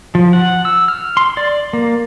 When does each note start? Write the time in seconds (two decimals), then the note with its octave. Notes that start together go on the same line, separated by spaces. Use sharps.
0.15 F3
0.33 F#5
0.65 E6
0.88 F6
1.17 C6
1.37 D5
1.73 A#3